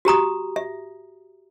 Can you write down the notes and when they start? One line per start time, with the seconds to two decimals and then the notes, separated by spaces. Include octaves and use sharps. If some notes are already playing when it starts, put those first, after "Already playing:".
0.05 F#4 G4 A#5 D#6
0.56 E5